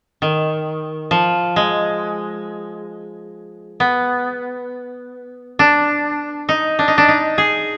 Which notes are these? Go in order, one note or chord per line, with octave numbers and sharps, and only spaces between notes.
D#3
F3
G#3
B3
D4
D#4
D4
D#4
D4
D#4
G#4